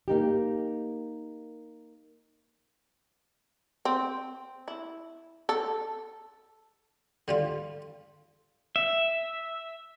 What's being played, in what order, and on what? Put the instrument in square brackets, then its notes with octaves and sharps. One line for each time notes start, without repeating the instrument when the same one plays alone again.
[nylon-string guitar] A#3 D#4 G4
[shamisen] C4
E4
A4
[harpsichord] D3 G3 F4
[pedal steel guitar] E5